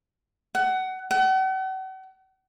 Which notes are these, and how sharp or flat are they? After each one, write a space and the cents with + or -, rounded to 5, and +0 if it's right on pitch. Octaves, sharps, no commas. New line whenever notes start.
F#5 +20
F#5 +40